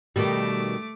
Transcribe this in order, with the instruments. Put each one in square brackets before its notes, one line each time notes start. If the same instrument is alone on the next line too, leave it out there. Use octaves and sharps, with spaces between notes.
[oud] B2 D#3 G3 [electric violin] A3 D6